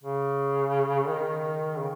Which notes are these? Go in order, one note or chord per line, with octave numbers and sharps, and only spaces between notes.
C#3
D#3
C#3